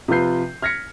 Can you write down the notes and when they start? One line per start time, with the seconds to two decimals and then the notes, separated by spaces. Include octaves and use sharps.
0.08 C3 F3 F4 B4 G6 C7
0.62 F6 G#6 A#6 B6 C#7